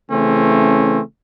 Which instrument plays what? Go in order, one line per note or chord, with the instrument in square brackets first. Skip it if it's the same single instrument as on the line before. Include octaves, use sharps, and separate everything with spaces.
[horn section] C#3 E3 A3 C4 C#4